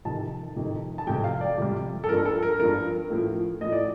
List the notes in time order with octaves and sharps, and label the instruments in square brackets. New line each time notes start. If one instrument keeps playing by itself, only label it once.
[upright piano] F2 C3 D#3 A5
F2 C3 D#3
A5
F2 C3 G3 G5
F5
D5
F2 C3 G3
A4
F3 A#4
G2
A4
A#4
G2 F3 A#4
A2 F3
A2 F3 D#5
D5